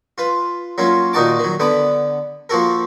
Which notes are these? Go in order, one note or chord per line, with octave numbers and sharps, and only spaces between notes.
F4 B4
F#3 A#3 C#4 F4
A#2 D#3 D#4 F#4 A5 D6
D#3 F#3
D3 B3 B5 D6
F3 A#3 F#4 A4 A#4